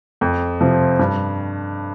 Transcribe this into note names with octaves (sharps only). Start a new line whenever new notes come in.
F2
C3 F3 C4
G2